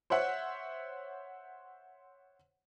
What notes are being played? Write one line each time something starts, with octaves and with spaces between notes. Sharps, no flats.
C5 C#5 E5 F#5